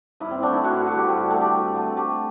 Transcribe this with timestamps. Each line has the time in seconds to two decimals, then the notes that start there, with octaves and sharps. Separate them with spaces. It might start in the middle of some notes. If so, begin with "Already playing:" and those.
0.20 G2 E4
0.31 C4
0.42 D3 A3 D4
0.53 E4
0.64 G2 F#4
0.76 F#4
0.87 D3 A3 F#4
0.97 G4
1.08 G2 G4
1.20 F#4
1.30 D3 A3 A4
1.41 G4
1.52 G2 F#4
1.74 D3 A3
1.97 A3 G4